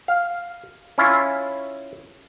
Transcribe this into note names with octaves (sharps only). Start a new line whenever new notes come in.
F5
C#4 E4 F4